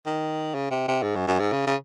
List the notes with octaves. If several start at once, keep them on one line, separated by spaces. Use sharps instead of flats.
D#3
C#3
C3
C3
G#2
F#2
F#2
G#2
C#3
C#3